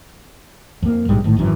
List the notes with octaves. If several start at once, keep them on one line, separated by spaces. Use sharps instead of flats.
F2 A#3
A#1 G#2 G3 G#3
G#1 A2
G#1 F#2 E3